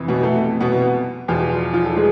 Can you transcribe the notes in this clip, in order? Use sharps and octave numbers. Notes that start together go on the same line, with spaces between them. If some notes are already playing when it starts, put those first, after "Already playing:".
Already playing: F2 C3 E3
B2 B3
A3
B2 B3
E2 B2 F3 F4
F3 F4
A4
G#3 G#4